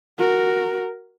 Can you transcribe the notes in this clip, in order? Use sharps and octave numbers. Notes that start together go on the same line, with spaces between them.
F#4 A#4